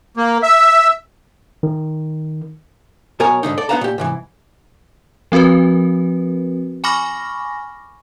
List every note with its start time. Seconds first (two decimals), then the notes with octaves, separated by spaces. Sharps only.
0.17 A#3
0.43 E5
1.63 D#3
3.20 B1 B2 A#4 C#5 G#5 A#5
3.43 G#2 B2 D3 D#4
3.58 A4 D5
3.69 B3 D#4 B4 F5 A5 A#5
3.81 A#2 G4
3.98 G#2 C3 E3
5.32 F3 C4 F#4 A#4 B4
6.84 G#5 B5 C#6 D6 F6 A#6